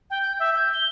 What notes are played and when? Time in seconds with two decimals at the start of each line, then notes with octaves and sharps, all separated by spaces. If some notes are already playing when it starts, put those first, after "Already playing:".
0.10 G5
0.22 G6
0.40 E5
0.55 G6
0.74 G7